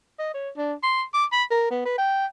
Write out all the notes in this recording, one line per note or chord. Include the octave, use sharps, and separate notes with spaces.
D#5
C#5
D4
C6
D6
B5
A#4
B3
B4
G5